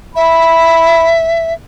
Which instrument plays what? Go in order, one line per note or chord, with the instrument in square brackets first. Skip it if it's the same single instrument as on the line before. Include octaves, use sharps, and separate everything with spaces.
[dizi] E5 [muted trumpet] B5